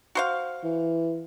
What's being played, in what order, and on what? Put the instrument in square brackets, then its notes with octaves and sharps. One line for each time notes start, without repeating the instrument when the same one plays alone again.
[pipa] F#4 C5 F5
[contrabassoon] E3